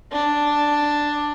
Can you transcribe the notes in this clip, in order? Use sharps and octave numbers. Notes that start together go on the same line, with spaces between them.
D4